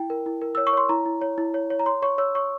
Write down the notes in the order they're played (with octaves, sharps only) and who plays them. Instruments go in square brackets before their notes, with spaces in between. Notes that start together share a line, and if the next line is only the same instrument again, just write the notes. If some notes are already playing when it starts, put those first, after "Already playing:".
Already playing: [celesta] E4 G5
A#4
E4
A#4
C#5 E6
C#6
C#5 C6
E4 A#5
E4
C#5
E4
C#5
C#5
A#5
C#5 C6
C#5 C#6
C#5 E6
C#5 C#6